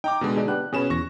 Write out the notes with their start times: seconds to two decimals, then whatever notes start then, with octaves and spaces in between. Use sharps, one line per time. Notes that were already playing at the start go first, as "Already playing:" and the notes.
0.04 D#4 G5 A#5 D6
0.21 B2 D3 G#3
0.36 D4 D#4 G#4
0.48 B3 D4 G4 F#6
0.73 B2 C#4 G#4 B4 E7
0.90 E2 C#6 A#6